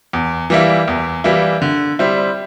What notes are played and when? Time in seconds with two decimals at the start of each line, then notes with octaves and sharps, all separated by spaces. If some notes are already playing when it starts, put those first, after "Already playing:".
0.13 E2
0.50 E3 G3 A#3 E4
0.88 E2
1.24 E3 G3 A#3 E4
1.62 D3
1.99 G3 C4 E4